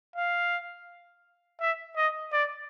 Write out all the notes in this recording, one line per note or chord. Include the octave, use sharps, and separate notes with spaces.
F5
E5
D#5
D5